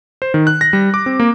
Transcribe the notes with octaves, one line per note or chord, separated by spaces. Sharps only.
C5
D#3
F#6
A#6
G3
D6
C4
A#3